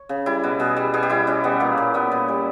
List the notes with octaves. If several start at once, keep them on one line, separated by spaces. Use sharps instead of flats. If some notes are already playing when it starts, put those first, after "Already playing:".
Already playing: C#5
C#3
G3 E4
B2
B2 G#4
G3
B2 G#4
G4
G3 E4
B2 C#4
G3 B3
A#2 A#3
A#2
A#2 B3
A#2
G3